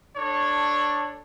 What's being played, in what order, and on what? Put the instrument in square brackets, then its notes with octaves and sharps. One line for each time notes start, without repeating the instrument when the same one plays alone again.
[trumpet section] D4 A4 C#5